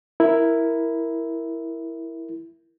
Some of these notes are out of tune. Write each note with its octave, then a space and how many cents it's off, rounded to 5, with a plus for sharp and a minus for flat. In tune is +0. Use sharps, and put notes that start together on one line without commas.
E4 +0 A#4 +0